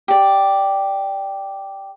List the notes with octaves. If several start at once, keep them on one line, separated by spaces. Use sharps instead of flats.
G4 D5